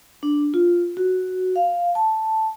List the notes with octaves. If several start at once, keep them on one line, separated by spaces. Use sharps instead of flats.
D4
F4
F#4
F5
A5